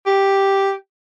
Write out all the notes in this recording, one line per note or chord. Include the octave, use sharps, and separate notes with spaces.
G4